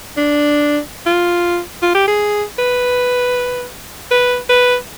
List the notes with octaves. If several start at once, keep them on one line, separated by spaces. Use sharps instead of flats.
D4
F4
F4
G4
G#4
B4
B4
B4